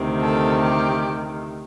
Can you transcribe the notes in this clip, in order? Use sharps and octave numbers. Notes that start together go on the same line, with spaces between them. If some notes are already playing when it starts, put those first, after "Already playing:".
Already playing: D2 C3 D#3
A4
G4